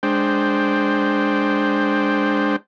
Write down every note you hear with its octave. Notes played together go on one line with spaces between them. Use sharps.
G#3 D4 C5 G5